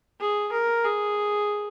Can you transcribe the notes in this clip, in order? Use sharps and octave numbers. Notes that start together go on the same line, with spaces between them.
G#4
A#4
G#4